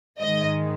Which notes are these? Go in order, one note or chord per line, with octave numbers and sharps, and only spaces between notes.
G#2 D#3 G#3 D#5